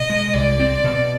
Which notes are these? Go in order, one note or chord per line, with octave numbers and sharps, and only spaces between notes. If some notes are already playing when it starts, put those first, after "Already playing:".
Already playing: B2 D#5
G#3
C2 D5
C4
B2